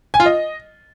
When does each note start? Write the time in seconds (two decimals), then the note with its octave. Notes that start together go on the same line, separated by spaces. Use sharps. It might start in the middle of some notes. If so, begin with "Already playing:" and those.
0.14 G#5
0.20 F4
0.26 D#5